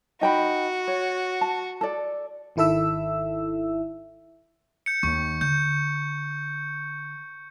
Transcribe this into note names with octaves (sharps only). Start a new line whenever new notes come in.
D#4 F#4 G5 B5
C#5
A5
A4 D5
G#1 D#3 E4 A4 E5 E6
G6 C#7
D#2 C#6
D3 G6